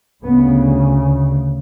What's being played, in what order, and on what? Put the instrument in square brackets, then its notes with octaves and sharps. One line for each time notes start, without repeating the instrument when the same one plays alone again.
[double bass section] D2 C#3 B3